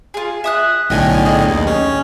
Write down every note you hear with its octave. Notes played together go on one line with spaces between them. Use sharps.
F4 G#4
E5 D#6 F#6
B1 A2 D3 D#5 G5 G#5
G#4 D#5
D#2
C#4